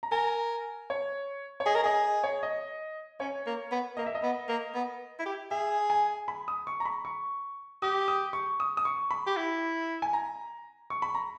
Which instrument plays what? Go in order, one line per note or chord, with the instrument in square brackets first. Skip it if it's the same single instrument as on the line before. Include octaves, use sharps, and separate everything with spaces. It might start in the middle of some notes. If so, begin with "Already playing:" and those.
[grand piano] A#5
[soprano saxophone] A#4 [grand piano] G#5
[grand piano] C#5
C#5
[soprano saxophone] G#4 [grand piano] D#5
[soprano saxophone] A#4
[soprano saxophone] G#4 [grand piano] D#5
[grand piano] C#5
D#5
[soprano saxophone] C#4 [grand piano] C#5
[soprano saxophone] A#3
B3
[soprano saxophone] A#3 [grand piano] D#5
[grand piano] E5
D#5
[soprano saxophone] B3
A#3
B3
E4
G4
[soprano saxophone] G#4 [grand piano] E5
[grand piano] G#5
B5
D#6
C#6
A#5
B5
C#6
[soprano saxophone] G4 [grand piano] D#6
[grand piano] D#6
C#6
D#6
D#6
C#6
B5
[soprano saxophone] G4
E4
[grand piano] G#5
A#5
C#6
B5
A#5